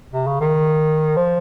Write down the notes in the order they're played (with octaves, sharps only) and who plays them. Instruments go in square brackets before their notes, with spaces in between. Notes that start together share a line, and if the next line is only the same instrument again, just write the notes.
[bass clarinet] C3
C#3
D#3
F3